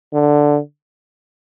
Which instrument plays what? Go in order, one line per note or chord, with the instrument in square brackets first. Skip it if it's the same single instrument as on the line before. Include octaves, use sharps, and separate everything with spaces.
[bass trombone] D3